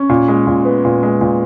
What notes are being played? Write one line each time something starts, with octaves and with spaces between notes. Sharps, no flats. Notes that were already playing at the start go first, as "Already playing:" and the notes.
Already playing: C#4
A#2
G#3
A#2
B3
A#2
G#3
A#2